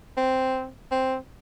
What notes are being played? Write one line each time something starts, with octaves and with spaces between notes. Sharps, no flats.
C4
C4